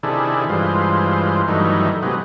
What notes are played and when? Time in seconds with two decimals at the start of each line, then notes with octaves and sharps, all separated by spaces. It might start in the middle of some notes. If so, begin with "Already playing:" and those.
0.03 C3 D#3 D4 E4 G#4 A4
0.49 G2 E3 G#3 F4 C5
1.48 G2 D#3 E3 F#3 A3 D#4
2.03 C3 F#3 G#3 B3 D#4